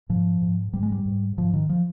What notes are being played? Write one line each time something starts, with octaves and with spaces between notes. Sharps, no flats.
G#2 F3
G#2
G#2 G3
G#3
G3
G#2
G#2 F3
D#3
F3